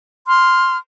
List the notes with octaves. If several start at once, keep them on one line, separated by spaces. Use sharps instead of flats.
C6 F6